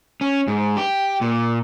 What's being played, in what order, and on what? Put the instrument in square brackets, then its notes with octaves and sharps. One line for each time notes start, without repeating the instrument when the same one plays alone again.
[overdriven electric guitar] C#4
G#2
G4
A#2